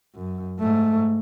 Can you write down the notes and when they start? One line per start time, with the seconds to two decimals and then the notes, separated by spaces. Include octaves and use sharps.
0.15 F#2
0.60 G#2 A3